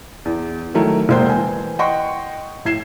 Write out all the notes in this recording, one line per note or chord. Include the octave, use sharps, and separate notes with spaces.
E2
D#3 F#3 A3 E4 A#4
E1 A#3 C5 G5 G6
E3 G#5
D#5 F#5 G5 C6 C#6
A2 E4 G#6 C7 E7